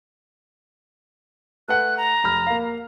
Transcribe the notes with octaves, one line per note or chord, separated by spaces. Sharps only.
A3 B4 F#5 F#6
A#5
F1 B5 F6
A#3 F5